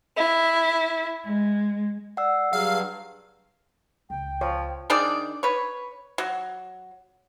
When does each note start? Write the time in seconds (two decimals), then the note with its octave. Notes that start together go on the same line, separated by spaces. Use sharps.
0.17 E4
1.24 G#3
2.17 D5 F#5 E6
2.53 G2 F#3 G#4 F5
4.10 C#2 G5
4.41 F3 C#5
4.90 D#3 D4 G#4 D5
5.43 B4 C#5
6.18 F#3